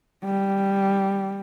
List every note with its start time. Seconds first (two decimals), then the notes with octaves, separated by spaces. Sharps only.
0.25 G3